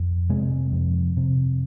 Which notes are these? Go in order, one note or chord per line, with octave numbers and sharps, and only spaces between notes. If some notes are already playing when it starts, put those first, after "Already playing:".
Already playing: F2
C3 G#3
F2
C3